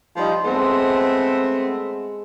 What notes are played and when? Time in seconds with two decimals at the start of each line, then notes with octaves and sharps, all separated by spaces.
0.17 F3 G3 D#4 C5
0.44 G#3 A3 B3 C4